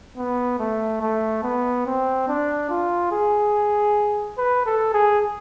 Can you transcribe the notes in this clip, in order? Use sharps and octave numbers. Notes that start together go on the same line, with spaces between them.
B3
A3
A3
B3
C4
D4
F4
G#4
B4
A4
G#4